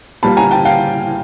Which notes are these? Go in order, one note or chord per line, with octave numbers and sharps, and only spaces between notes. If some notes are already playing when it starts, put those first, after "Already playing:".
A#2 G3 A#3 A5 B5
G#5 A#5
G5 A5
F5 G5